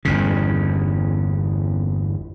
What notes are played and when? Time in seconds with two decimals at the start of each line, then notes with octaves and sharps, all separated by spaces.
0.05 G1 E2 C#3